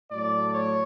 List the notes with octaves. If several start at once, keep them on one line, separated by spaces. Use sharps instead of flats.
A2 F#3 A3 D5
C#5